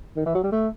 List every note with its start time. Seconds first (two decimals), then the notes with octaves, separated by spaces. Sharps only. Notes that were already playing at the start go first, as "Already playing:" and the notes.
0.16 D#3
0.26 E3
0.35 F#3
0.43 G3
0.52 A3